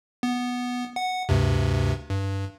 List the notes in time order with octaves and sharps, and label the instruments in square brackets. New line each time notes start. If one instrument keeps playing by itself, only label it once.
[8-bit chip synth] B3
F#5
D2 G2 C3
G2